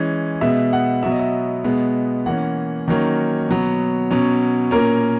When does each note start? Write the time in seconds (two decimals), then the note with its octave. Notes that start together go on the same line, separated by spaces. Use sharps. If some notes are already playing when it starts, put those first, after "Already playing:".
Already playing: E3 G#3 C#4
0.41 B2 G#3 B3 E5
0.73 F#5
1.03 B2 F#3 B3 E5
1.12 D#5
1.19 E5
1.64 B2 G#3 B3
2.26 E3 A#3 C#4 F#5
2.88 D#3 F#3 A#3 C#4
3.49 B2 F#3 B3
4.11 B2 F#3 C#4
4.71 A#2 A#3 C#4 A#4